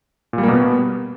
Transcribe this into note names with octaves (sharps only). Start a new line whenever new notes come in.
A#2
G3
A#3
B2
B3